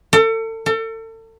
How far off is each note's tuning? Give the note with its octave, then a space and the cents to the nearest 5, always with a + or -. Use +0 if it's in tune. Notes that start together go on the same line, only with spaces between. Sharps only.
A4 +35
A4 +35